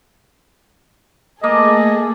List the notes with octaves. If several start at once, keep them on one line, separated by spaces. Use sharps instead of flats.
A3 A#3 G#4 A4 D#5